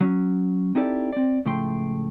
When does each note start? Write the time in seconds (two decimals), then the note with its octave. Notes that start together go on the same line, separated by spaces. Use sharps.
0.01 F#3 C#4
0.75 C4 D#4 E4 G4 A4 D5
1.13 C4 D5
1.45 C#2 A2 F3 A3 G5 C6